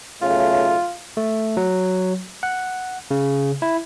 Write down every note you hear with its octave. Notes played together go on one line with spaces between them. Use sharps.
B1 C#3 A3 F4
A3
F#3
F#5
C#3
E4